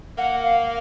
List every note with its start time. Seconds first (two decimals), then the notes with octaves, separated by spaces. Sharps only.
0.18 A#3 F#5
0.44 F5